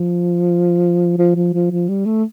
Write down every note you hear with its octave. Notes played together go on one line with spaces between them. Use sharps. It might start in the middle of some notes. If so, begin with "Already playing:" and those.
Already playing: F3
F3
F3
F3
F3
G3
A3